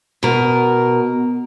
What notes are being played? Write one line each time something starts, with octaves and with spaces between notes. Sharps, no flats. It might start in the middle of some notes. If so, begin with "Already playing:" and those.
B2 A#4